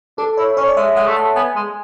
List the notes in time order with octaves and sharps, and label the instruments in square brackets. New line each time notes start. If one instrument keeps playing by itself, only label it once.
[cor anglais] D4 [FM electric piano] A4
[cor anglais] E4 [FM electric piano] C#5
[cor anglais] C#4 [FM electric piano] C#5
[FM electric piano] D5
[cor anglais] G#3 [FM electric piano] E5
[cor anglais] G#3 [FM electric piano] F#5
[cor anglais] A3
[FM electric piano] A5
[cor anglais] B3 [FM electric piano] G#5
[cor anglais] G#3